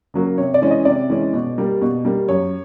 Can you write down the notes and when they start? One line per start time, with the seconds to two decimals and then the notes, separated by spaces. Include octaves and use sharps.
0.14 C#3 F#3 A#3
0.38 C3 C#5
0.54 D5
0.62 E3 G#3 C#4
0.71 D#5
0.85 C3 D5
1.10 E3 G#3 C#4
1.34 B2
1.58 G3 A#3
1.82 B2
2.05 G3 A#3
2.28 F#2 C#5